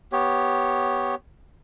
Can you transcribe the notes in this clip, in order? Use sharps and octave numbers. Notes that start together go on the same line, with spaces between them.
B3 G4 C#5